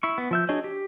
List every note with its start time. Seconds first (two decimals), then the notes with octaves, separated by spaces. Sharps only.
0.03 E4 C#6
0.18 B3
0.31 F3 E5 G6
0.49 D4 F#4 G#4 C#5 D#5
0.64 G4